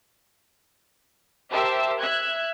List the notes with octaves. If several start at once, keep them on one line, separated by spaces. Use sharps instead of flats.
G4 A#4 C5 E5 A5 E6
E5 F#6 G#6